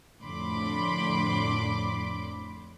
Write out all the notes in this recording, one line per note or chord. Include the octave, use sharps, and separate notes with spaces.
F2 A2 D3 B5 C6 D6